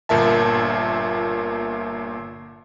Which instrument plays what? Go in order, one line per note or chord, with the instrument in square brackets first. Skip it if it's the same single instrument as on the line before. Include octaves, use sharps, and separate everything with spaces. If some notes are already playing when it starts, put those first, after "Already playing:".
[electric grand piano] G1 A#2 A#4 E5 A5